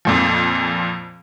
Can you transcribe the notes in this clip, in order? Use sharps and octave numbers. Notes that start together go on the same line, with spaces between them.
F2 A#2 F3